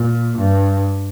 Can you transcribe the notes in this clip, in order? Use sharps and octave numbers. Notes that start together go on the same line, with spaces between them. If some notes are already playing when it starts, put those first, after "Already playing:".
Already playing: A#2
G2